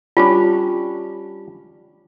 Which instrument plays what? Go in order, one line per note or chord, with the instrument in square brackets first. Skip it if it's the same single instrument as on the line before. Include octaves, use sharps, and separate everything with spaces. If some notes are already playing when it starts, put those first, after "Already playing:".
[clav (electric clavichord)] G3 C#4 D4 [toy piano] F4